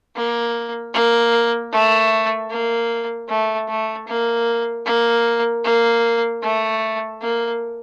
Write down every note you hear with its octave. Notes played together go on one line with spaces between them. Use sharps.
A#3
A#3
A3
A#3
A3
A3
A#3
A#3
A#3
A3
A#3